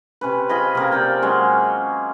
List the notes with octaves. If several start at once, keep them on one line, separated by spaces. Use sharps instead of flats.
C3 C#4 B4
F4 G#4 D#5 B5
C3 A#3
C3 G4 D5 G5
F#3 G#3 C#4